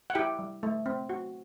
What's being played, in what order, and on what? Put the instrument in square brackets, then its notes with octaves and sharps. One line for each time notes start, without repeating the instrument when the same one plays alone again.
[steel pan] F#5
E4 G4 G5
G3
A3
C4
F#4